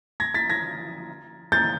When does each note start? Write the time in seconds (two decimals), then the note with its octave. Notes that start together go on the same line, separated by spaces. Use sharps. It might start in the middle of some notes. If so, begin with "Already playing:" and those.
0.20 G#6 A#6
0.34 A6 B6
0.50 G#6 A#6
1.52 G6 A6